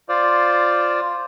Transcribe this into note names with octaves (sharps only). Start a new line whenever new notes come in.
F4 C5 D5